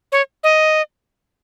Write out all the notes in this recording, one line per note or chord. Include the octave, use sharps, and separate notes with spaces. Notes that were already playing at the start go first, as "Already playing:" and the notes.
C#5
D#5